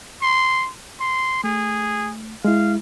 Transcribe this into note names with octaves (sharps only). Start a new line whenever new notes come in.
C6
C6
A3 G#4
G#3 E4 F5